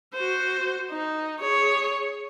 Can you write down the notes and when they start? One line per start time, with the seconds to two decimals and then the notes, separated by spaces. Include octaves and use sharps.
0.14 F#4 C5
0.91 D#4
1.40 G#4 C#5